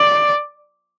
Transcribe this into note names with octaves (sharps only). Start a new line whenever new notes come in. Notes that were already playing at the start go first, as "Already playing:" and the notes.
Already playing: D5